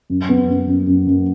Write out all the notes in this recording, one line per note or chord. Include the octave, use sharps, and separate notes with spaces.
F#2
B3
F#2
F#2
F#2
F#2